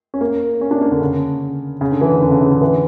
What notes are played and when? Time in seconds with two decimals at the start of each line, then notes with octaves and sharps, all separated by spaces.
0.14 C#4
0.21 A#3
0.61 C#4
0.71 D4
0.81 A#3
0.91 D3
1.01 C#3
1.81 C#3
1.92 D3
2.01 E3
2.12 C#3
2.22 D3
2.31 C#3
2.42 C#3
2.51 D3
2.61 E3